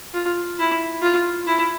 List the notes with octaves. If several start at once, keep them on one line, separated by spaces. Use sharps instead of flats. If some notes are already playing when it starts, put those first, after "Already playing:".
F4
E4
F4
E4